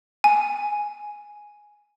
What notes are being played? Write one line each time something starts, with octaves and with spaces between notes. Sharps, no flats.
G#5